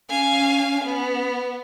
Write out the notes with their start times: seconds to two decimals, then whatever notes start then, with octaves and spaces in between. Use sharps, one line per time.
0.10 C#4 F5 G#5
0.85 B3